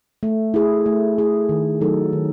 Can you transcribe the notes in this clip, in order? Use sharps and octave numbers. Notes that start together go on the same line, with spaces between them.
A3
E4 G#4
A3
E4 G#4
D#3
F#3 A3 D#4 A4
D#3